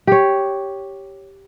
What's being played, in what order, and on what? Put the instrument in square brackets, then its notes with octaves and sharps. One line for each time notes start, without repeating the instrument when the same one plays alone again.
[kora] G4 C#5